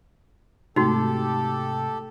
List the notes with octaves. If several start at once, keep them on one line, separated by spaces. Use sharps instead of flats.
G#2 C3 A3 D#4 F#4 G4 A4